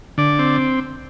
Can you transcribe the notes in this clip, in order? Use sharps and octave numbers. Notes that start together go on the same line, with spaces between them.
D3 D5
C4